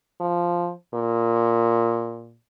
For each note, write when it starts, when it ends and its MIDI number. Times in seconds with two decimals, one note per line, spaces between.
0.21 0.72 53
0.94 2.37 46